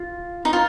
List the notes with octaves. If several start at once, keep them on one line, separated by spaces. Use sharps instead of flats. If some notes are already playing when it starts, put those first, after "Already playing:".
Already playing: F4
D#4
F4